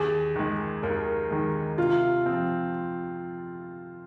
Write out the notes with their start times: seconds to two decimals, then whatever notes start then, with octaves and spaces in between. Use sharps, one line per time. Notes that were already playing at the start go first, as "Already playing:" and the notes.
Already playing: D#2 G#4
0.36 D#3 G#3
0.83 D#2 A#4
1.30 D#3 G#3
1.78 C3 F4
2.26 F3 C4